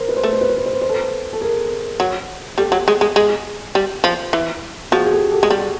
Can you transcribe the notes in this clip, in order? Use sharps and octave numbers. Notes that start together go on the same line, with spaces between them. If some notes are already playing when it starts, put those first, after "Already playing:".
Already playing: A#4 C5
B4
C5
A3 B4
C5
B4
C5
B4
C5
B4
C5
A4 B4
A4
G#4 A#4
F#3
G3 G4 A4
F#3
G#3
G#3
G#3
G3
F3
E3
F3 F#4 G#4
G#4
G4 A4
G4 A4
G#3
G3